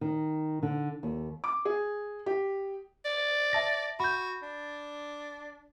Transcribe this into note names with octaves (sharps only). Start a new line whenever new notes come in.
D#3
D3
D#2
D6
G#4
G4
D5
E5 A5 A#6
F#4 B5 G6
D4